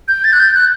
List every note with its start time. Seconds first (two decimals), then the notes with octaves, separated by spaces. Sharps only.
0.08 G6
0.24 A6
0.33 F#6
0.40 G6
0.55 F#6